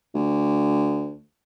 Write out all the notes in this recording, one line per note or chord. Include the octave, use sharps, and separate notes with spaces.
D2